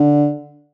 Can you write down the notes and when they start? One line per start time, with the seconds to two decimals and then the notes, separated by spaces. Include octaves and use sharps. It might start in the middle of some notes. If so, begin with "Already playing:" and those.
Already playing: D3